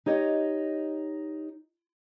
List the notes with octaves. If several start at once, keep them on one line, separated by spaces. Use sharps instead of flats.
D#4 G4 C#5 D#5